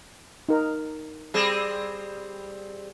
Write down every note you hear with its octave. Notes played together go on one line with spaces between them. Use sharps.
D#4 A#4
G3 C4 G#4